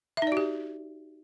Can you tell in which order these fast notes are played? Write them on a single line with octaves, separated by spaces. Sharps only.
E5 D#4 D5 F#4 G4